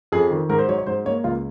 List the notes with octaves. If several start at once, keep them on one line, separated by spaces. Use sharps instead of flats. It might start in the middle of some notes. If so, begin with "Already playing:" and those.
F2 G#4
D#3
G#2 A#4
C5
F#3 C#5
C#5
G#2 C5
A#3 C#5
C#2 F4